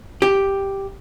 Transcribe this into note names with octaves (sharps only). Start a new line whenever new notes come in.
G4